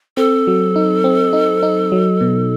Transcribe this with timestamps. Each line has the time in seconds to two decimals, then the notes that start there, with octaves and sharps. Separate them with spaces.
0.17 C4 A4
0.47 F#3
0.76 D#4
1.04 C4
1.33 D#4
1.63 D#4
1.92 F#3
2.21 B2